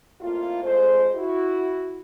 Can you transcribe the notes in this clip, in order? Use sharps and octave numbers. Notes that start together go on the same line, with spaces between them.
F2 A2 A#3 F4
F2 G#3 A3 C5
E4 F#4